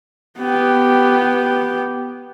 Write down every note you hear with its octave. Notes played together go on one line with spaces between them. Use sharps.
B3 G4